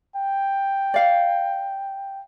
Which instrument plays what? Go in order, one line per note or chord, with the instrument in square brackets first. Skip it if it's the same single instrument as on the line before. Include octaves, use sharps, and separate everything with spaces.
[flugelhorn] G5
[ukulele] D5 F5